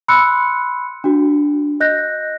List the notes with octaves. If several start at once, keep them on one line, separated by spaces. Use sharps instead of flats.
B5 C6 E6 F#6 C#7
D4 F#4
D#5 F#6 G6 A#6